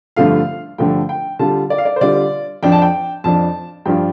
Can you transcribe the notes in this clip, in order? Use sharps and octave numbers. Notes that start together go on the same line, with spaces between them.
G2 D3 F3 A3 F4 F5
G2 D3 F3 A3 F4 G5
G5
D3 G3 F4 A5
D5
F5
D5
C5
D3 G3 F4 D5
F2 F3 D4 G5
A5
G5
F2 F3 D4 A5
G2 F3 D4 F4 G5